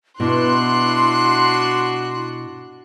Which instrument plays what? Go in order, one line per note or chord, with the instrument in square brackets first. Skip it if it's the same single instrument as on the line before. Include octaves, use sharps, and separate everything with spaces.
[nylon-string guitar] B2 [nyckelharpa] D4 F#4 [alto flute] E4 [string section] C6 F#6